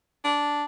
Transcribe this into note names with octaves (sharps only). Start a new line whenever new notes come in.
D4